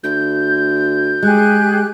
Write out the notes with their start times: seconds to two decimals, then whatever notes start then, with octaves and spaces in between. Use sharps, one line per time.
0.04 D2 G6
1.23 G#3 G4 G#4 F#6